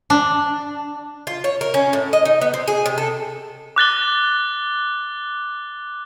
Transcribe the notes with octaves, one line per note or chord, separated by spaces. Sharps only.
D4
F4
C#5
A#4
C#4
A2
D#5
D#4
B3
C4
G#4
C3
A4
D6 F#6 A6 G7